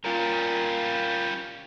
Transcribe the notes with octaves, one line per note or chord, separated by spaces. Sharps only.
G3 C#4 F4 A#4